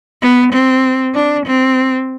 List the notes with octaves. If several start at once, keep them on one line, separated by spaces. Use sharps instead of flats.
B3
C4
D4
C4